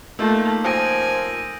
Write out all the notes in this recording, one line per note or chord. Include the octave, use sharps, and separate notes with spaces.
A3 A#3 D#4 F4 E6 G6
F3 G#5 D#6 A#6 D7